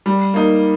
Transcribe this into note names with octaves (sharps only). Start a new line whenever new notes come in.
G3
A#3 D#4